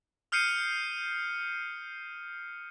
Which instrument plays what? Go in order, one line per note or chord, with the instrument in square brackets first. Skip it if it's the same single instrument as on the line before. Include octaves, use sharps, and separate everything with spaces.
[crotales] D#6 F6 G6 C7 C#7 D#7